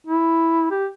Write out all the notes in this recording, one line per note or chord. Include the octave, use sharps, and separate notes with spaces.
E4
G4